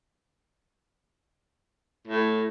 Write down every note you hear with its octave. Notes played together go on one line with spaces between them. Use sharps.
A2